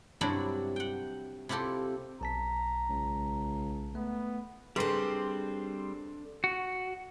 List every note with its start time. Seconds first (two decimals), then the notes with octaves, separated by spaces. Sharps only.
0.21 G2 C3 F#3 D4 E4 D5
0.76 F#5 G5
1.49 C3 E4 F4 G4 A4
2.21 B1 A5 A#5 B6
2.89 C#2
3.95 A3 B3
4.76 G3 C4 D4 G#4 A4 B4 C5 C6
6.44 F#4